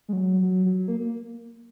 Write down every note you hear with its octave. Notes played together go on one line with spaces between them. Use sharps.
G#3
F#3
F#3
F#3
A#3
A#3